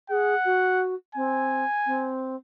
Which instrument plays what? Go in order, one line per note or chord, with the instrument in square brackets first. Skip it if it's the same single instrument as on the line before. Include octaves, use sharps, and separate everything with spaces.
[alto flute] G#4 [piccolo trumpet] F#5
[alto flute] F#4
[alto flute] C4 [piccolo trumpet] G#5
[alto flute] C4